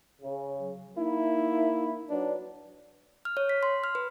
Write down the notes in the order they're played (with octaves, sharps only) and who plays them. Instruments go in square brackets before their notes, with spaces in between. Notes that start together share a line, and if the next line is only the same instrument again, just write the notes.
[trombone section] C#3
[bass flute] F#3
[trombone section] A#3 E4 [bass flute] D#4
[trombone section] F#3 D4 [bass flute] B4
[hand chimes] F6
C#5
B6
C6
F6
B4